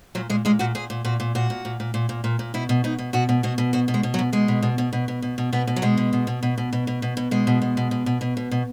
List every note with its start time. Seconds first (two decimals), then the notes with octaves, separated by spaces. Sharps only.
0.15 A#2 F#3
0.29 A#2 G#3
0.45 A#2 G#3
0.59 A#2 F#4
0.75 A#2 G#4
0.90 A#2
1.05 A#2 F#4
1.20 A#2
1.35 A#2 F#4
1.50 A#2
1.65 A#2
1.80 A#2
1.94 A#2
2.09 A#2
2.24 A#2
2.39 A#2
2.54 B2 E4
2.69 B2
2.84 B2 D#4
2.99 B2
3.13 B2 F#4
3.29 B2
3.43 B2 F#4
3.58 B2
3.73 B2 F#4
3.88 B2
3.94 G#3
4.03 B2
4.14 F#3
4.19 B2
4.33 B2 G#3
4.48 B2
4.63 B2
4.78 B2
4.93 B2
5.08 B2
5.22 B2
5.38 B2
5.53 B2 B3
5.67 B2
5.76 F#3
5.82 B2 G#3
5.97 B2
6.13 B2
6.27 B2
6.43 B2
6.58 B2
6.73 B2
6.87 B2
7.02 B2
7.17 B2
7.31 B2 G#3
7.47 B2
7.62 B2
7.77 B2
7.91 B2
8.06 B2
8.21 B2
8.37 B2
8.51 B2